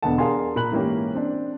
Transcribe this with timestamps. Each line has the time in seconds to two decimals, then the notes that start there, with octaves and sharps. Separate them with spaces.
0.02 E1 D3 B3 D#5 F#5 A5
0.18 D4 G#4 A#4 F5 G#5 C6
0.56 A#2 A#4 B5 F#6 F#7
0.71 G#2 E3 A#3 C#4 G4
1.15 C4 D4